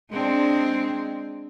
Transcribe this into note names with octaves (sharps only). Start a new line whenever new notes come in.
G#3 C4 D4